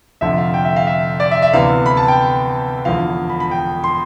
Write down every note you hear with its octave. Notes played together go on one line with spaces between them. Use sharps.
F1 F2 D3 E5
F5
G5
E5
F5
E5
D5
E5
E5
D2 C3 E3 B3 F5
B5
A5
G5
E1 E2 D3 F3 F5
B5
B5
G5
C6